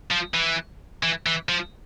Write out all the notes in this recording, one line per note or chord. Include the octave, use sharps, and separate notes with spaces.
F3
E3
E3
E3
F3